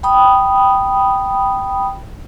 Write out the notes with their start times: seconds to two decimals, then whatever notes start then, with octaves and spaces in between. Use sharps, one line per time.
0.03 G5 B5 D#6